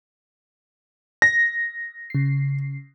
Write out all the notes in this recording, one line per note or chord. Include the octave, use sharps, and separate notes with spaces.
A#6
C#3 C7